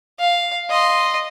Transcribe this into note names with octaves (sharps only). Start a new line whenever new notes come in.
F5
D#5 C6